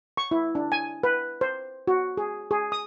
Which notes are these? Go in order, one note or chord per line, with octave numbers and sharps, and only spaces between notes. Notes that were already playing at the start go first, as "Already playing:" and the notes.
C#6
E4
D4
G#5
B4
C5
F#4
G#4
G#4
D#6